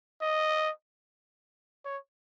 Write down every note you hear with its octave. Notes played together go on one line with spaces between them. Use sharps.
D#5
C#5